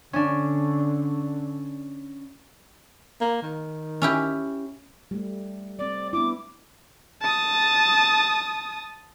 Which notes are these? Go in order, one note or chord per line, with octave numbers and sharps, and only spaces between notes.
D3 C#4 D4
A#3
D#3
C#4 E4 G4
G3 A3
G3 C4 D5
B3 D4 E4 D6
A5 D#6